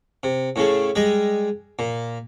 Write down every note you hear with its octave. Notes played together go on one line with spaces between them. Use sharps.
C3
A2 C#3 A3
G3 G#3 D#5
A#2